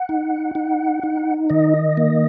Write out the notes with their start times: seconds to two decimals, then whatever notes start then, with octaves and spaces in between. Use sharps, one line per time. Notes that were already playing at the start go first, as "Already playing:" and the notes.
Already playing: F#5
0.09 D#4
0.55 D#4
1.03 D#4
1.50 D#3 D#5
1.97 A#3